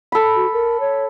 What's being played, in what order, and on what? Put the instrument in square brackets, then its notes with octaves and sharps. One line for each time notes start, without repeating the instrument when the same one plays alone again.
[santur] A4 B5
[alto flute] F#4
A#4
C#5